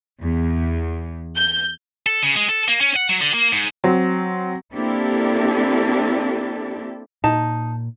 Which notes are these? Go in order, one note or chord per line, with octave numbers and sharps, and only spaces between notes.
E2
G6
A4
C#3
G#3
A4
A#3
C#4
F#5
F#3
D3
A#3
G#2
F#3 C4
A#3 C4 D4 E4 G4 A4
A#2 D#4 A5